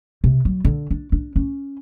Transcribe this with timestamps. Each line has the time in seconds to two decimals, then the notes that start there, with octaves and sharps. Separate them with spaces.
0.24 C3
0.45 F#3
0.65 D3
0.91 D4
1.12 D4
1.36 C#4